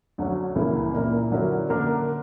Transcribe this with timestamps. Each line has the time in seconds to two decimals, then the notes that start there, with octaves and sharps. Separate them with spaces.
0.18 D2 D3 F#3 C#4 F#4
0.55 C#2 C#3 E3 A#3 E4
0.94 A#2 A#3 E4 A#4
1.32 D3 F#3 C#4 E4 A#4
1.69 D3 A#3 D4 A#4